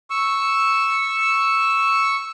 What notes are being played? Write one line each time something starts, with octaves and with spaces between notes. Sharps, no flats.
C#6 E6